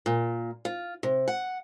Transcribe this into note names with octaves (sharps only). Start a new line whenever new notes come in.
A#2
F4
C3
F#5